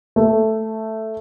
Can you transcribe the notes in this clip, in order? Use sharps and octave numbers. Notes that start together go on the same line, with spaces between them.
A3